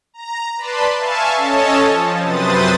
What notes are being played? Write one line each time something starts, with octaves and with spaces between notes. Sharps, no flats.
A#5
B4 D5 A5 B5 C6
E5 F5 G#5 A5 C#6
C#4 A4 C#5 D#5 A5
F3
F#2 C3 B4 C5 D#6 A6